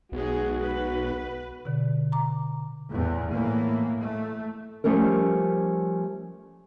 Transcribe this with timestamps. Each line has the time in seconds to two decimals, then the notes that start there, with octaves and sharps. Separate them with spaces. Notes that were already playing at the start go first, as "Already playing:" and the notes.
0.12 B1 G#3 F#4 G#4
0.61 B4
1.65 B2 D3
2.12 A#5 D6
2.90 E2 A2
3.31 A2 E3 A#3 B3
4.01 A3
4.84 F3 G3 A3 C#4 A#4